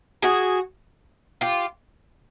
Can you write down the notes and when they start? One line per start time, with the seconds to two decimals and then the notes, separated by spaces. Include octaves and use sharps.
0.22 F#4 G#4
1.41 F4 G4